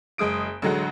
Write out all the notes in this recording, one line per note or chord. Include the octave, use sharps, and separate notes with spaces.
F#1 G#3 D#6 D7
A1 D3 F#3 G#3 F#5